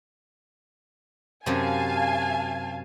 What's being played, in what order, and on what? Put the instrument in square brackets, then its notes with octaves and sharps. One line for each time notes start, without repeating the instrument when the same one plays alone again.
[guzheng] F#2 C3 [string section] F5 G#5 A5